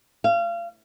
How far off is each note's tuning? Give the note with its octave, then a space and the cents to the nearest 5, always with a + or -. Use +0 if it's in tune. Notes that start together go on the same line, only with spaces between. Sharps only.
F5 -30